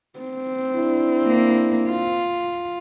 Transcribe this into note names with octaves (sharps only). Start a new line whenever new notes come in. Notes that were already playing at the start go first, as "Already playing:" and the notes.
C4
D4 E4
A#3
F4